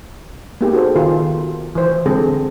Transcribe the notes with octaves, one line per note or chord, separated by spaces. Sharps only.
A#3 B3 D#4 G4 G#4
F#4 G#4 A4 C5
D#3 F4 A#4
E3 C5
D3 G#3 C4 G#4 A4